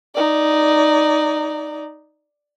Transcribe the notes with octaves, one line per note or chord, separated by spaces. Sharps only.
D#4 D5